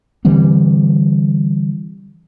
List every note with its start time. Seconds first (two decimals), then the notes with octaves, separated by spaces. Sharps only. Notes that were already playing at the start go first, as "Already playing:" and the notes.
0.25 D3 E3 G3 C4